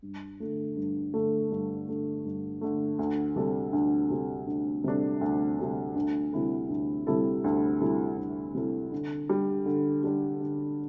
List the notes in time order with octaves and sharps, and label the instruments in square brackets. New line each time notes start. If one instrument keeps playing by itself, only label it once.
[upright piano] G2
D3 A3
G2
D3 A3
G2
D3 A3
G2
D3 A3
D2
C3 G3 D4 A4
D2
C3 G3 D4 A4
D2
C3 G3 D4 A4
D2
C3 G3 D4 A4
D2
C3 G3 E4 A4
D2
C3 G3 E4 A4
D2
C3 G3 E4 A4
D2
C3 G3 E4 A4
D3
G3 D4 G4
D3
G3 D4 G4
D3